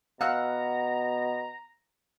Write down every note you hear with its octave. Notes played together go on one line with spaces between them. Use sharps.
B2 F5 F#5 A#5 E6 F#6